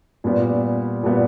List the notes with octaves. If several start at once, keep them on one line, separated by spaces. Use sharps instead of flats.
A#2 G3 B3
A#2 G3 B3